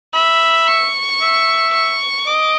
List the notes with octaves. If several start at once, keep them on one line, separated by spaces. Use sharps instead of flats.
E5 B5
C#6
E5
C#6
D#5 D6